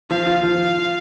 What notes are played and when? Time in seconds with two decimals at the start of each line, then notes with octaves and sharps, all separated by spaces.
0.10 F3 F5
0.27 F4
0.43 F3